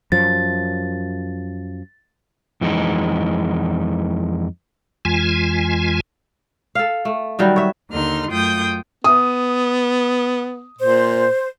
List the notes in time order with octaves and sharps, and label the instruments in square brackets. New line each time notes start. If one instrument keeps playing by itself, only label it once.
[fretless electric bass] F#2 F3 [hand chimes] A6
[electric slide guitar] F2 E3 G#3 D#4
[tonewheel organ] F2 E3 G#3 F4 G#5
[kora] A4 F5
A3
D#3 F#3 G3
C#5 E5
[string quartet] D#2 D3 D#4 C6 F6
F#2 A3 F4 G5 D#6 G6
[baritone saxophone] B3 [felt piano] D#6
[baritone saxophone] A#2 [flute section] C5